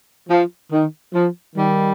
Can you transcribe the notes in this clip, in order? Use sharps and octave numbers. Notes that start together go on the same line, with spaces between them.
F3
D#3
F3
D#3 G3